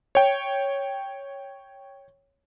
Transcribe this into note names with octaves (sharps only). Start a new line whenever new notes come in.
C#5 G5